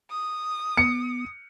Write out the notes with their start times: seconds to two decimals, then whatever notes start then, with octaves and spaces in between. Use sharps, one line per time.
0.10 D#6
0.77 B3 C#7